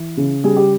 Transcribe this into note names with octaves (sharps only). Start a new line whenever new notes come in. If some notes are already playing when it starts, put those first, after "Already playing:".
Already playing: E3
C#3
G3 G#4
G4